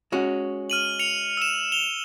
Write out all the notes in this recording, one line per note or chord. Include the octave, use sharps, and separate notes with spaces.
G#3 C#4 F#4
F6 D#7 F#7
C#7 F7
E6 E7
F7 G7